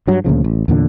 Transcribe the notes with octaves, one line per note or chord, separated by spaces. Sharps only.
G2 F#3
D2 A#2 C#3 F3
A1
E2 A#2 D3